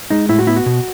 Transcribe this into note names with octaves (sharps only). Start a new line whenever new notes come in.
G#3 D#4
A2 E4
F#4
B3 E4
F#4
B2